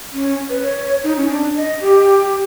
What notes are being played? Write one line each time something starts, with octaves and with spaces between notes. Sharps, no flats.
C#4
B4
C#5
D#4
C#4
D4
D#5
G4